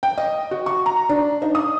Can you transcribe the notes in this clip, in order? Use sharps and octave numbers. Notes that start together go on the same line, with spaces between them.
G5
D#5
F#4
C#6
A#5
D4
D#4
D#6